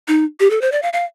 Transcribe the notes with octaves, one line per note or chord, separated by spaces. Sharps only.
D#4
G4
A4
C5
D5
F5
F5